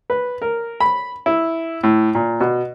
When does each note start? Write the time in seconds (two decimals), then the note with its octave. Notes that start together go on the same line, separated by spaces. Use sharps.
0.10 B4
0.42 A#4
0.80 B5
1.26 E4
1.83 A2
2.15 A#2
2.40 B2